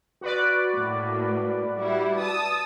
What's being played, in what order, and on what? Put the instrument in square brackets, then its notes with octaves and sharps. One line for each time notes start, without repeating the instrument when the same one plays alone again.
[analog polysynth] F#4 B4 D5
[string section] A2 A#3
G3 E4
A5 D#6 E6